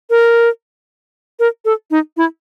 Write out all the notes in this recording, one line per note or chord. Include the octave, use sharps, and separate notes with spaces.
A#4
A#4
A4
D#4
E4